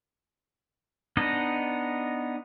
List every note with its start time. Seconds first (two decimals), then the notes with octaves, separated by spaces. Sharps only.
1.17 B3 D4 D#4 D#5